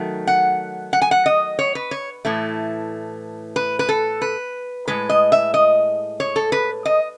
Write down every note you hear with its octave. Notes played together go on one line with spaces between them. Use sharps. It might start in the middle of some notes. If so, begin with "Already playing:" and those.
Already playing: D#3 F#3 A3
F#5
F#5
G#5
F#5
D#5
C#5
B4
C#5
A2 E3 A3
B4
B4
A4
B4
A2 G#3 B4
D#5
E5
D#5
C#5
A4
B4
D#5